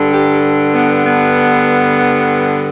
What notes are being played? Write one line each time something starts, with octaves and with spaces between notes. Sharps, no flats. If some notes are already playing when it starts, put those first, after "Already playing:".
Already playing: G2 D3
G4
B3
B3